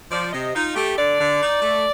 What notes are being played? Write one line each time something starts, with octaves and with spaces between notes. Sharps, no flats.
F3 D5
C3 D#5
D#4 F4
A3 G4
D3 D5
D3
D#4
A3